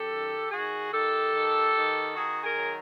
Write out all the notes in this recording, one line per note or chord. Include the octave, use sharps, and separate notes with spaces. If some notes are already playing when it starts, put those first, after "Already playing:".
Already playing: F#2 G4 A4
D#3
D#3 F#4 G#4
D#3 G4 A4
D#3
D#3
D#3 F#4 G#4
G#4 A#4
F#3